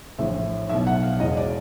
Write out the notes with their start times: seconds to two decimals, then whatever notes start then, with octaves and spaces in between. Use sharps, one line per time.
0.19 A#1 A2 E3 E5
0.69 B1 B2 E5
0.87 F#5
1.03 F5
1.20 E1 E2 C#3 E3 D#5
1.37 D5